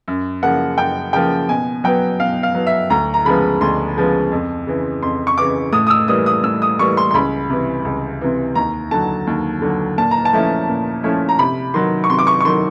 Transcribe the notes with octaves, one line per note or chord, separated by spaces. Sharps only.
F#2
C#3 F3 A#3 F#5
F#2 G5
C#3 F3 A#3 G5
B2 G#5
F#3 B3 G5
B2 F5
F5
F#3 B3
E5
D2 A#5
A#5
C#3 F3 G#3 B3 B5
D2 C6
C#3 F3 G#3 B3
F2
C#3 E3
F2 C6
C#6
C#3 E3 D6
A2 D#6
D#6
E6
E3 G3 A#3 D#6
D#6
A2 E6
D#6
E3 G3 A#3 C#6
C6
C6
C#2 B5
C3 E3
C#2
C3 E3
D#2 A#5
D3 F#3 A5
D#2
D3 F#3
A#2 A5
A#5
A5
F3 A3 C#4 E4
A#2
F3 A3 C#4 E4
A#5
C3 B5
D#3 F#3 C6
C#6
C3 C6
D6
C#6
C#6
D#3 F#3 C6